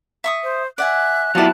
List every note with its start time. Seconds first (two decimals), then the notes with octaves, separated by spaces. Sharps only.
0.24 E5 C#6 D#6
0.43 C5
0.78 D5 E5 F#5 G#5 F#6
1.35 F#3 B3 E4 F4 G4 D5 F5 A5